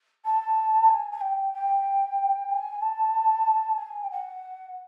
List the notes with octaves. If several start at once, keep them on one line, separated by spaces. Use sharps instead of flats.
A5
G#5
G#5
G5
G5
G#5
A5
G#5
G5
F#5